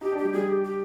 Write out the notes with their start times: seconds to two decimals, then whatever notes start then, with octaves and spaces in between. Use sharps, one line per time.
0.01 D#4 G4
0.12 D4
0.18 G3 G4
0.33 G3 G#4
0.48 G4
0.64 G4